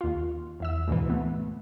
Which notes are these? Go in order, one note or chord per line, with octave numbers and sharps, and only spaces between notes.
D#2 F4
E2 E5 E6
D2 G#2 B2 E3
A3 B3